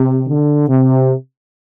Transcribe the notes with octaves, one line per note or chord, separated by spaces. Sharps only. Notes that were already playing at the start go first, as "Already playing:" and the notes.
Already playing: C3
D3
C3